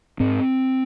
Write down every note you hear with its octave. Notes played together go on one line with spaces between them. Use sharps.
G#2 C4